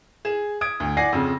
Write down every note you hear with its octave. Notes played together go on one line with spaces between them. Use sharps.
G#4 E7
D#6 G#6 D7
D2
D5 F#5 G#5 D6 A#6 C7
F2 C#3